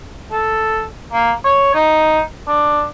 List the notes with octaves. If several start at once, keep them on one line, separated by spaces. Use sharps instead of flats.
A4
A#3
C#5
D#4
D4